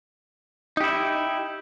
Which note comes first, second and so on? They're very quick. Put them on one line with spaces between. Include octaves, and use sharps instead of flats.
D#4 G4 E4